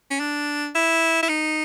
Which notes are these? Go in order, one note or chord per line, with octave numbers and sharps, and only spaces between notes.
C#4
D4
E4
E4
D#4